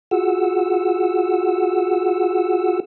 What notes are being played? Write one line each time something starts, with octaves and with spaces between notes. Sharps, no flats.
F4 F#4 G#4 F#5 E6